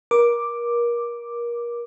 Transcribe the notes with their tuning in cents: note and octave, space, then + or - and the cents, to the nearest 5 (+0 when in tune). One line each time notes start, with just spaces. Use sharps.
A#4 +30 D6 +0